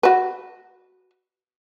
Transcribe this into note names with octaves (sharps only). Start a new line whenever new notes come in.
F#4 B4